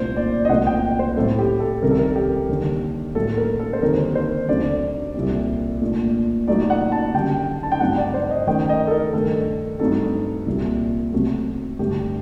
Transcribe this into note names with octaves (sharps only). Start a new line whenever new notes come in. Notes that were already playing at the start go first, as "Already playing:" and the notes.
Already playing: C2 A#2 A3 D4 C5
D5
D#5
C2 A#2 F#3 A3 F#5
G5
C5
A2 F#3 C4 A4
G4
A4
C2 C3 D#3 G3 A#4
A4
A#4
G4
D#2 D3 G3
A2 F#3 A#3 A4
A#4
A4
C5
D#2 D3 G3 C4 D#4 A#4
C5
D2 D3 F#3 C4 D5
C2 A#2 G3
A#2 A3 D4
A#2 F#3 A3 D#4 D5
F#5
A5
F#2 D3 G3 G5
A5
G5
G2 F#3 A3 C4 D#4 F#5
D5
C5
D#5
F#2 D#3 A3 D#4 G5
D#5
A4
A#4
G2 D#3 A3 D4 A4
G2 F#3 A3 C4 D#4 A4
C2 A#2 G3
C3 F#3 A3
G2 D3 A3 G4